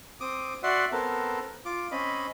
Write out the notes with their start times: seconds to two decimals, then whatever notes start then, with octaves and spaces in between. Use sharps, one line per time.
0.20 C4 D6 D#6
0.63 F#4 D5 E5 F#5 C6
0.92 B3 C4 A4 A#4
1.65 F4 D6
1.92 C4 C#4 D#5 B5